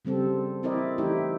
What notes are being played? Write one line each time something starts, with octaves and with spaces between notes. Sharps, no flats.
C#3 G3 C4 A4
C4 E4 A#4 D5 D#5
E3 A3 D#4 E4 G4